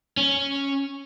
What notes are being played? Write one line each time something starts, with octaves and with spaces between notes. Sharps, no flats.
C#4